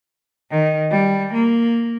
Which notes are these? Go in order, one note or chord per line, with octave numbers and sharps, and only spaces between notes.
D#3
G3
A#3